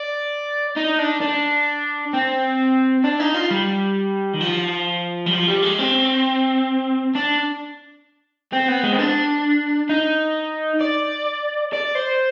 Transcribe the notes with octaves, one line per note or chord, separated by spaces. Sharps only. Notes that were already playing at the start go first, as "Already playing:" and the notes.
Already playing: D5
D#4
D4
D4
C4
D4
D#4
F4
G3
D#3
F3
G3
F3
G3
G#3
C4
D4
C4
B3
G#3
C4
D4
D#4
D5
D5
C5